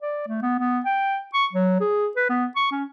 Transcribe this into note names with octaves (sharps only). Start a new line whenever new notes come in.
D5
A3
B3
B3
G5
C#6
F#3
G#4
B4
B3
C#6
C#4